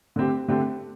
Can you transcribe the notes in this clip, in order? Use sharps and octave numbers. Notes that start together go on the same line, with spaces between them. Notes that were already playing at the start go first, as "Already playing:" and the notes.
D3 A3 C4 G4
D3 A3 C4 G4